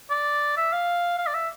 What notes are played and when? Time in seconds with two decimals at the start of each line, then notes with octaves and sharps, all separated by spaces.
0.10 D5
0.57 E5
0.73 F5
1.18 F5
1.27 D5
1.34 E5